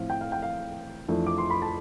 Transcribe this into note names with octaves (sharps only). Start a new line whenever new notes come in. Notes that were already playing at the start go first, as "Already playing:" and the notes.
Already playing: A2 F3 C4 F5
G5
F5
G5
F5
F2 E3 A3 D4
D6
C6
B5
A5